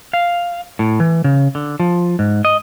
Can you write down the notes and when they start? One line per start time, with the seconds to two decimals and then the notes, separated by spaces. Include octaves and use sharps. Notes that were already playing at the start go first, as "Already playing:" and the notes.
0.13 F5
0.79 A2
1.00 E3
1.24 C#3
1.55 D3
1.80 F3
2.19 G#2
2.45 D#5